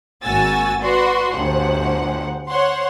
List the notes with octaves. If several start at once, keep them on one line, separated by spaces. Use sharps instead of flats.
G#1 A#3 F#4 G#5 E6 A6
F#4 B4 D5 C6
G1 D2 C5 F#5
C5 C#5 F#5 C6